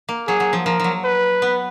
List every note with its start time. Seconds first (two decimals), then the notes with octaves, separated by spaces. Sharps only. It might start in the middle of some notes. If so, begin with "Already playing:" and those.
0.09 A#3
0.28 F#3 G#4
0.40 F#3
0.53 F3
0.66 F3 A#4
0.79 F3 F#3
1.04 B4
1.42 B3